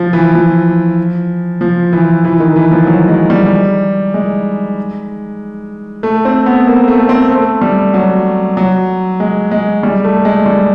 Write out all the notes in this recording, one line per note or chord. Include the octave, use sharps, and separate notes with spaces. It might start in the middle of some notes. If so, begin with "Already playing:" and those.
Already playing: F3
E3
F3
F3
E3
E3
D#3
E3
F3
F#3
G#3
G3
G#3
A3
C4
B3
A#3
A3
C4
A3
G3
F#3
F#3
G#3
G#3
G3
A3
G#3
G3